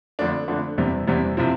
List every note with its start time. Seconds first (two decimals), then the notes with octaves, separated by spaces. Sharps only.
0.19 F2 D3 A3 D4
0.48 F2 D3 A3 D4
0.78 E2 C3 G3
1.07 E2 C3 G3
1.37 C3 F3 C4 E4